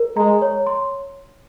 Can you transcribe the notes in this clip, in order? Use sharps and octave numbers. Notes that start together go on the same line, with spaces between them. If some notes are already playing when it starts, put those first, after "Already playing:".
Already playing: A#4
G#3 A#5
C#5
C6